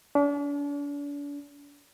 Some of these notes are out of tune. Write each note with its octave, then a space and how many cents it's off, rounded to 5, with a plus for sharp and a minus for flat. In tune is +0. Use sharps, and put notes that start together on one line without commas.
D4 -40